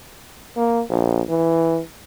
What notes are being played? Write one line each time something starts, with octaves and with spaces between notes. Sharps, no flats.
A#3
A#1
E3